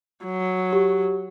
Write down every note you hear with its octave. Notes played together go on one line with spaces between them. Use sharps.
F#3
G4